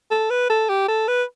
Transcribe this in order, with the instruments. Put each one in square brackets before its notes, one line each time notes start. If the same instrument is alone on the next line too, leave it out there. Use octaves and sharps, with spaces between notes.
[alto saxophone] A4
B4
A4
G4
A4
B4